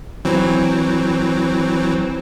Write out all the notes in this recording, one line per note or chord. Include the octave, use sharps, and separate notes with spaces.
E3 F#3 C4